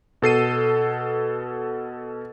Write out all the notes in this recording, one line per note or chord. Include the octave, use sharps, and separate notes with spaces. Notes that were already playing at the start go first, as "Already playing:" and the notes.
B2 A4 C7 D#7